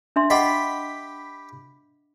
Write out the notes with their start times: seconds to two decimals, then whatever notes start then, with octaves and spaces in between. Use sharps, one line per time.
0.16 D4 E5 C6
0.30 G4 D#5 F#5 B5